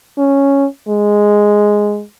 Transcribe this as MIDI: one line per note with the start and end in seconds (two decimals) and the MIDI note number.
0.18 0.66 61
0.88 2.03 56